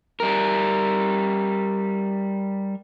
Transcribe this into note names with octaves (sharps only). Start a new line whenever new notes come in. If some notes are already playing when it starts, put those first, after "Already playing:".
G3 A#4